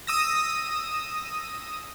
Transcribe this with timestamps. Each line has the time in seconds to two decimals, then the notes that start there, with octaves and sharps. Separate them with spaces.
0.07 D#6 E6 A#6